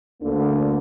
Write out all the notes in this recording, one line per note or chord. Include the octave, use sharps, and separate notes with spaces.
D2 D3 A#3